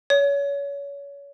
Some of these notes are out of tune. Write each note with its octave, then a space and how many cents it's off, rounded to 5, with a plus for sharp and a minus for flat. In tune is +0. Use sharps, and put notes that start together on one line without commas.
C#5 +30